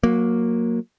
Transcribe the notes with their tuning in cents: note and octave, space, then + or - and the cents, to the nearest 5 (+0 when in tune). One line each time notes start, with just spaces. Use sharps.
F#3 -20 A#3 +0